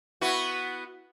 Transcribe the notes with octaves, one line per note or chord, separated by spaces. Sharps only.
B3 E4 F#4